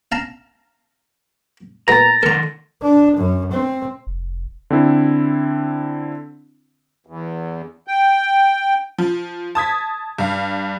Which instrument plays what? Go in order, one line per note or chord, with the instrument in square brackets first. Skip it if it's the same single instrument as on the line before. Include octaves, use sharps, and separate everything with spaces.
[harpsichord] F5 A5 A#5
[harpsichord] A#2 G#3 B3 [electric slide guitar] A#5 [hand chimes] A6 A#6
[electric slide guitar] D#3 A4 [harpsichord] A#4 A#5
[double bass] D4
F#2
C4
[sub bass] F1
[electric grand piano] D3 C4 E4
[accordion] E2
G5
[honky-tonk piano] F3
A5 D#6 G#6 B6
G2 F5